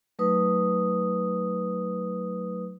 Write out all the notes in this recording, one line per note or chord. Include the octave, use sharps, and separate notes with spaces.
F#3 A3 D#4 B4 D#6